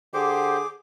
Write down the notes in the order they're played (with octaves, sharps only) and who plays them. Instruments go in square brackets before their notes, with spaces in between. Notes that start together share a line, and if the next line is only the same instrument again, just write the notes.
[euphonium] D3 [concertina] G4 C5 [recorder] G#4 [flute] D6